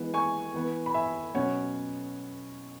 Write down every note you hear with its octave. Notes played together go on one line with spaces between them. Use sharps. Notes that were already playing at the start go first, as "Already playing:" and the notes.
Already playing: E3 G#3 B3
G#5 C#6
E3 B3
B5
E5 G#5
B2 F#3 C#4 C#5 F#5